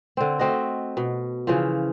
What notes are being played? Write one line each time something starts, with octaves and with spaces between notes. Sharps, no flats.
D3 C4
A3 C4 F#4 D#5
B2
C#3 E3 F3